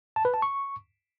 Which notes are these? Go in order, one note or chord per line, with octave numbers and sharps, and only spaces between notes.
A5
B4
A5
C#6